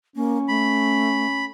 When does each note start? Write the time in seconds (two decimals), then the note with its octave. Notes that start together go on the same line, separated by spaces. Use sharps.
0.16 A#3 C#4
0.48 A3 B5